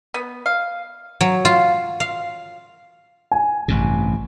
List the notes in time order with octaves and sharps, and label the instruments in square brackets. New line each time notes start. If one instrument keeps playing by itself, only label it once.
[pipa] B3
F5
[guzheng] F#3
F4
F5
[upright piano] G#5
[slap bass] A1 G2 C3